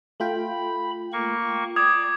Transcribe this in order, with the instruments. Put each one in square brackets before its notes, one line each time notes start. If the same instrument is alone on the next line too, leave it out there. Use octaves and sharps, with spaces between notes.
[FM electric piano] A3 F4 G5 [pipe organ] B5
[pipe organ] A#3 C#6
[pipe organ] D5 [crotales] D6 D#6 G#6